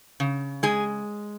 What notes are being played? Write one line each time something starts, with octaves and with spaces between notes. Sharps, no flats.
C#3
G#3 G#4